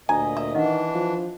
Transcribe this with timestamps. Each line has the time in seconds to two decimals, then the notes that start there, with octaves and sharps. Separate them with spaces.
0.09 D2 A#2 D#5 G#5 A#5
0.37 E5
0.55 D#3 E3 D4 D#5 F#5
0.95 F3